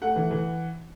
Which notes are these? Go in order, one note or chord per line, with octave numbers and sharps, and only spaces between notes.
A3 F#5
E3
E3